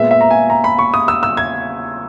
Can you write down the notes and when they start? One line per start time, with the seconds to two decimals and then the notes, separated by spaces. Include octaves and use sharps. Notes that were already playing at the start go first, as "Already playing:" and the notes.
Already playing: A#2 G#3 B3 E5
0.11 E5
0.21 A#5
0.31 G#5
0.50 A#5
0.64 B5
0.79 C#6
0.94 D#6
1.08 E6
1.23 E6
1.37 G#6